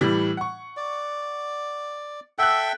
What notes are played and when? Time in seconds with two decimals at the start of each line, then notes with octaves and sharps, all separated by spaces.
0.01 A2 E3 G3
0.37 F#5 C#6
0.77 D5
2.39 A4 E5 F#5 G5 F#6